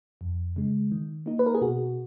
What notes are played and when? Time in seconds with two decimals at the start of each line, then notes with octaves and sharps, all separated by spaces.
0.21 F2
0.56 C#3 G#3
0.92 D#3
1.26 A#3 D#4
1.39 B4
1.46 A#4
1.55 G#4
1.61 B2 F#4